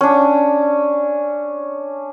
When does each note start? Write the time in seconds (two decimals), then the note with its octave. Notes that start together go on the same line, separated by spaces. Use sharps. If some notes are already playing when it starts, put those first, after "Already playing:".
0.01 C#4 D4